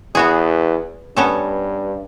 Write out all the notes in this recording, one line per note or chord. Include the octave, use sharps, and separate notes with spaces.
E2 B3 F#4 G#4
G2 B3 C#4 A4